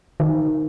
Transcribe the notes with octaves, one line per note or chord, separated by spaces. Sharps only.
D#3